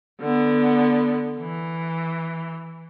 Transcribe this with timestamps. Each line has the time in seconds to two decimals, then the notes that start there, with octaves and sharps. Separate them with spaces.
0.21 D3 B3
1.40 E3